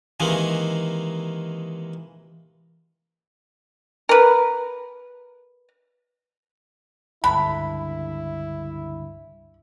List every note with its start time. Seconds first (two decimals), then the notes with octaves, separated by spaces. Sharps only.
0.20 C3 D#3 E3 G#3 A#3
4.09 A#4 B4
7.24 C#2 G2 D3 E4 B5